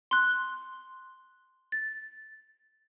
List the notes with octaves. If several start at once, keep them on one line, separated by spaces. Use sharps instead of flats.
C6 F#6
A6